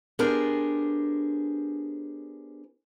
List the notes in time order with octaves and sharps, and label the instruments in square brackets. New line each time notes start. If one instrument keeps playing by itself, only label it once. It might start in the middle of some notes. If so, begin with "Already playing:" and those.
[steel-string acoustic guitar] B3 D4 G4 G#4 A#4 C5